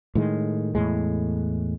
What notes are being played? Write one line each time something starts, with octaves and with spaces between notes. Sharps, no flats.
A2 D#3 G#3
E2 A2 G#3